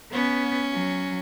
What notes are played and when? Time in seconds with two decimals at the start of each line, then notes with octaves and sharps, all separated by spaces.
0.12 B3 C#4
0.72 F#3